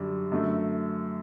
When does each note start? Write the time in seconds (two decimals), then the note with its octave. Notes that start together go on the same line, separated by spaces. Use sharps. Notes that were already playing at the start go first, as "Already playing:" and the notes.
Already playing: F#2 D3 G3 D4
0.31 F#2 D3 A3